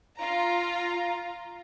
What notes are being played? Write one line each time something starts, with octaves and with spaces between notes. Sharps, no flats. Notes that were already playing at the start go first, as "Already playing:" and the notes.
F4 A#5